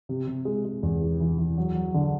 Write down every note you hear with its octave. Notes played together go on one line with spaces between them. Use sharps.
C3
C3
G#3
G#3
E2
E3
E3
E3
F#3
F#3
D3